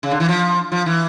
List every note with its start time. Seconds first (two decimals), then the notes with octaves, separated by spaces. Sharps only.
0.03 C#3
0.11 D3
0.20 E3
0.28 F3
0.72 F3
0.86 E3